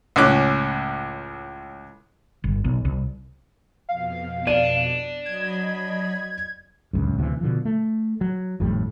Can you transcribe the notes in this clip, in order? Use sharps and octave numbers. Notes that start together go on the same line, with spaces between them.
C#2 A2 C#4 D6 F#6
G1
B1
C2
F2 B2 F5
D4 D5 D#7
F#3 D#5 B5 G#6
D1 C#2 F#2
D2 C3 E3
B2 D3 F3
A3
F#3
G#1 F2 A2 G3